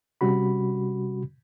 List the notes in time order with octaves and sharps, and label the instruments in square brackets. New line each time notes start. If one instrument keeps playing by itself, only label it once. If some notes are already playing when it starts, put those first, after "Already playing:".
[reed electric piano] C3 G3 C#4 F#4 B5